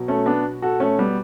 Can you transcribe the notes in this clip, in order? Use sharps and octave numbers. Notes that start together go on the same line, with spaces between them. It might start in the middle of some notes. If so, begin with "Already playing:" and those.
Already playing: B2 F#3
A3 C#4
B3 D4
F#4 A4
A3 C#4
G3 B3